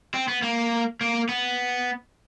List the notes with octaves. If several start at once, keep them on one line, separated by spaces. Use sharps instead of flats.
C4
B3
A#3
A#3
B3